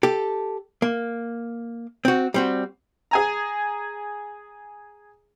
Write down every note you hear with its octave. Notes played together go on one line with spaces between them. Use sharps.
G4 A4
A#3
C4 F#4
G3 C4 F#4
G#4 G#5 A#5